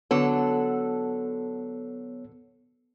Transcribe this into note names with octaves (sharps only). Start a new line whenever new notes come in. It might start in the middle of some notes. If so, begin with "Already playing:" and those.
D3 F#3 B3 A4 C#5